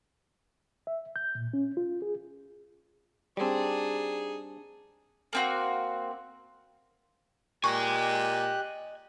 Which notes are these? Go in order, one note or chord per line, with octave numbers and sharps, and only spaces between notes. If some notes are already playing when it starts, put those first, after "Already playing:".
E5
G6
A#2
C#4
F4
G#4
G3 C4 D4 D#4 G#4
A#3 C4 F#4
A#2 G4 D#5 G#5 C#6 F#6